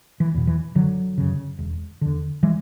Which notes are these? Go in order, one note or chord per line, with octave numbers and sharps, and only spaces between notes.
E3
E2 B2
E3
F#1 D3 F#3
F#2 C#3
E1
E2 D3
E3 G#3